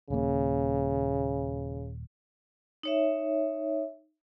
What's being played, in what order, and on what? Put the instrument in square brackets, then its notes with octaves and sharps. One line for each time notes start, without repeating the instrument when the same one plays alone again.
[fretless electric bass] D#1 A#3 [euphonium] C#3
[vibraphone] D#4 C#5 E5